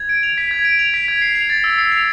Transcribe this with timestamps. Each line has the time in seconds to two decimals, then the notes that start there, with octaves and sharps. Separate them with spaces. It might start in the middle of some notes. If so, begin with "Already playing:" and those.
Already playing: G#6
0.09 D7
0.23 F7
0.38 B6
0.51 G#6
0.65 D7
0.79 F7
0.94 B6
1.08 G#6
1.22 C7
1.35 F7
1.50 A6
1.64 E6
1.79 C7
1.92 F7